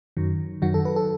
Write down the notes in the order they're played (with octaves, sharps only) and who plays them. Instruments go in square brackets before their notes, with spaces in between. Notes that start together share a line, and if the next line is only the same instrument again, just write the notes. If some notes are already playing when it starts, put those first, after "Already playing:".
[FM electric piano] F#2 D#3 F#3
F#2 D#3 F#3 F#4
A4
B4
A4